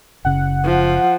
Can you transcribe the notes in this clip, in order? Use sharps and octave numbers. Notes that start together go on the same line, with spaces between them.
F#1 C#3 F#5
F3